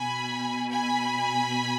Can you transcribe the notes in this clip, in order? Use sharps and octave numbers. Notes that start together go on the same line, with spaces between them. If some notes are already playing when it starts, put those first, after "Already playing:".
Already playing: B2 G#5 B5
G#5 B5